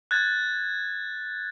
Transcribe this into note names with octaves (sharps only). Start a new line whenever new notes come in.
F#6 G#6 A6